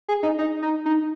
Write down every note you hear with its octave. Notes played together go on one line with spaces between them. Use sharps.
G#4
D#4
D#4
D#4
D#4